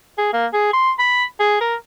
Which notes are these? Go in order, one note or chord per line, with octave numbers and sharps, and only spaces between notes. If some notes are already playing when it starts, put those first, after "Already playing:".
G#4
A#3
G#4
C6
B5
G#4
A#4